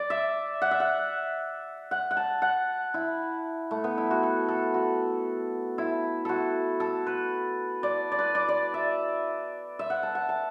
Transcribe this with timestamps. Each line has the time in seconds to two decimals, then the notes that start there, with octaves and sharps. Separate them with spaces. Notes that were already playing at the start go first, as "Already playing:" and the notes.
Already playing: D5
0.10 E5
0.62 F#5
0.71 E5
0.80 F#5
1.91 F#5
2.11 F#5
2.17 A5
2.42 F#5
2.94 E4
3.71 A3
3.84 B3
3.98 E4
4.11 F#4
4.23 A4
4.48 A4
4.74 F#4
5.78 E4
6.25 F#4 A4
6.80 A4
7.07 B4
7.83 D5
8.12 D5
8.19 B4
8.35 D5
8.49 D5
8.74 E5
9.79 E5
9.90 F#5
10.03 A5
10.15 F#5
10.29 A5